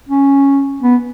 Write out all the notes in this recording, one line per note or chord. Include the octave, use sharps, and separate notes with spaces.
C#4
B3